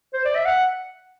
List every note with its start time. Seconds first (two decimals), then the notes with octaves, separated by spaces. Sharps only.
0.14 C5
0.25 D5
0.35 E5
0.45 F#5